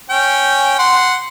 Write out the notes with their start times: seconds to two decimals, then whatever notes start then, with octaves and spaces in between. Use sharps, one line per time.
0.10 C#4 G5
0.79 F#5 C6